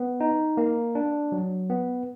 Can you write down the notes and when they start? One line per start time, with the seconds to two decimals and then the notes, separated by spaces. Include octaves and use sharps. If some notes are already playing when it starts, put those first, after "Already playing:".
Already playing: B3
0.20 D#4
0.57 A#3
0.95 D4
1.32 F#3
1.70 B3